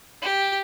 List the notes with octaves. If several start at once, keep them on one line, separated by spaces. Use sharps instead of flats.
G4